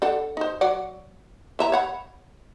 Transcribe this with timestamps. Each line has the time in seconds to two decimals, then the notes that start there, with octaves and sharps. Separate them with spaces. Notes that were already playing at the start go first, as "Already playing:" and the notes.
0.02 D4 A4 F#5
0.37 D#4 C5
0.61 F#3 D5 F#5
1.59 E3 E5 A#5
1.72 C#5 F#5 B5